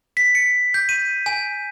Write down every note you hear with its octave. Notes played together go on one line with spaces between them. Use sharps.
B6
C#7
G6
D#7
G#5